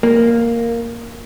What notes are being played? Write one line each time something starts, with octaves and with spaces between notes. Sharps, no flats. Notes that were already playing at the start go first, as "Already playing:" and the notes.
A#3